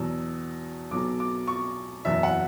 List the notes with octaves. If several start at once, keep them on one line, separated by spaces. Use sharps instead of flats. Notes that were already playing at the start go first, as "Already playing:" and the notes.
Already playing: E2 B2 F#3 E6
B1 B2 F#3 D6
D6
C#6
F#1 E2 B2 F#3 E5
F#5